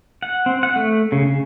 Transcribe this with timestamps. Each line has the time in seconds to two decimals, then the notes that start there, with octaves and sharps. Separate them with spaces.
0.22 F#5
0.46 C4
0.63 F#5
0.76 A3
1.12 C#3
1.26 C#3